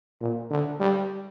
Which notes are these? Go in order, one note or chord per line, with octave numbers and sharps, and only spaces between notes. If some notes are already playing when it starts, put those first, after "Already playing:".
A#2
D3
G3